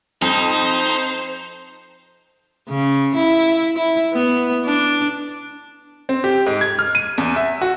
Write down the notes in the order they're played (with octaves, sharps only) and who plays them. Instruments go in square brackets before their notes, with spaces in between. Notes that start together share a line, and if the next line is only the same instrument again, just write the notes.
[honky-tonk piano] F2 [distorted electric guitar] D#4 [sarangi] C5
[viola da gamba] C#3
E4
E4
B3
D4
[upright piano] C4
G4
G#2
G#6
F6
D#7
E2
E5
F#4